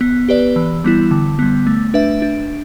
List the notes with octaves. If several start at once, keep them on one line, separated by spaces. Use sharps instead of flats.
B3
G4 B4 D5
E3
G3 B3 E4
D3
G3 B3
A3
D4 B4 E5
D4